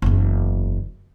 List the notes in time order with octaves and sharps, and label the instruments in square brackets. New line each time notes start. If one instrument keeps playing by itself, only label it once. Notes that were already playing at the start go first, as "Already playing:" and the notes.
[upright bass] F#1 E2